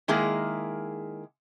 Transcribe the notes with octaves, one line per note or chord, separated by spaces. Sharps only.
D#3 G#3 A#3 E4 G#4